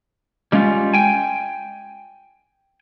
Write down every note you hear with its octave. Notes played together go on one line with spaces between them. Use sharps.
G3 G#3 C#4 D4 F4
G5 G#5